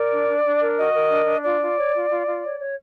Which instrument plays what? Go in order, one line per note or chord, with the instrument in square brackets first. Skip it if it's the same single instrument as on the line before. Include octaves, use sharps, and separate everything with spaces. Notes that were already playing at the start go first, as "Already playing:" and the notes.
Already playing: [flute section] A#4 D5
D4
D4
D4
A#4
F#4 D#5
A#4
D4
D4
F4 D5
F4
C#5
F4
F4
F4
C#5
C#5